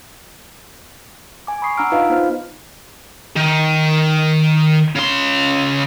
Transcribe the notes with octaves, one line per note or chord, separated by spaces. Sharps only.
G#5 D6
B5 C#6 D#6 C7
D4 F#5 A#5 E6 F6 D7
D#4 F4 B4 D#5 F5 B5
B3 D#4 F4 C5 F6
D#3
C#3 C6